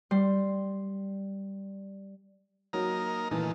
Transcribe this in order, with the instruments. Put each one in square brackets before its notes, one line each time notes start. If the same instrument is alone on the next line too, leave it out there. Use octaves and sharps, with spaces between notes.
[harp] G3 C6
[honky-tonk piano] F#3 [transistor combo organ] A#3 D#4 A#4
[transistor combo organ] A#2 D#3 A3 [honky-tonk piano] E3